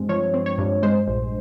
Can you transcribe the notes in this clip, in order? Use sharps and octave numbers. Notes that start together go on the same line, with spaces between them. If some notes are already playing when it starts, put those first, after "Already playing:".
Already playing: G2 G#3 C4
F3 C#5
C4
C#5
G2
G#3 C5
A#1